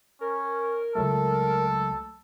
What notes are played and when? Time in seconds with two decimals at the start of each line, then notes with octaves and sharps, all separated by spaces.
0.21 C#4 A#4
0.95 C#2 F#3 A3 A4